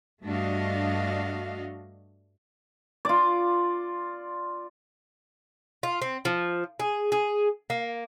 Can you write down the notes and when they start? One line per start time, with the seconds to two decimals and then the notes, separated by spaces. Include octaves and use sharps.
0.23 G2 A3 D4 F#4 D#5 F5
3.05 F4 D5
5.83 F4
6.02 C4
6.25 F3
6.80 G#4
7.12 G#4
7.70 A#3